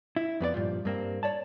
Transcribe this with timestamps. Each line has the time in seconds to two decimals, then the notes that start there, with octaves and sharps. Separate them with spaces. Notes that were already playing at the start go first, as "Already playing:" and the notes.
0.16 E4
0.40 F2 B3 F#4 D5
0.54 G2 A#2 F3
0.85 G2 A#3 C4
1.23 C#5 D5 A5